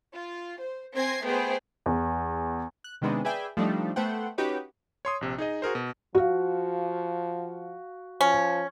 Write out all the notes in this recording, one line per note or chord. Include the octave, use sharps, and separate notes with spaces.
F4
C5
C4 G#5 G#6 A#6 C7
A3 B3 G#4 C5 G5
E2
F#6
C3 D#3 G#3 B3 C4 D4
G#4 B4 D5 E5 G5 G#5
F3 G3 A3 D4 D#4
A3 B3 C5 F#5 G5
C#4 D#4 F#4 G4 B4 C#5
C#5 C6 D#6
A#1 C3
D#4 G#4 D#5
F#4 G#4 A#4 C5
B2
F3 F#4 F5
F3 C#4